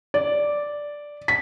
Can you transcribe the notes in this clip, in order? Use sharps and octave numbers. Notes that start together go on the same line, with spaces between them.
D5
B6